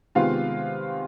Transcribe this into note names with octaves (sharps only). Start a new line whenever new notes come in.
C3 D#3 G#3 B3 F4 F5